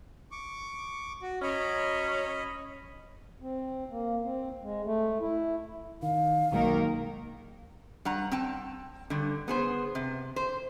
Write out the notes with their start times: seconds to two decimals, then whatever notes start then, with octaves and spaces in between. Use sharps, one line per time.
0.31 C#6 D6
1.22 F#4
1.42 F#3 C#4 D#5 B5
3.40 C4
3.91 A#3
4.24 C4
4.62 G#3
4.85 A3
5.20 E4
6.02 D#3 F5
6.52 B1 D#3 F#3 G#3 A#3 A#4
8.05 G2 F#5 A#5
8.32 C4 G5 A5
9.10 G2 D3
9.48 B3 G#4 C5
9.95 C3
10.36 C5